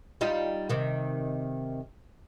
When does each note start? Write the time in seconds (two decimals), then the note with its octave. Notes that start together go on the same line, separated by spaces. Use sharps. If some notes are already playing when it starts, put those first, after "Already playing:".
0.21 G3 D#4 F4
0.69 C3 D#3